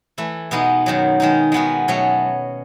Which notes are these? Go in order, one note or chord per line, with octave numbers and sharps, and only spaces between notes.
E3 A3 E4
B2 G#3 B3 D#4
F#2 D#3 F#3
D#3 G#3 D#4
D#3 G#3 B3 F#4
B2 F#3 A3 C#4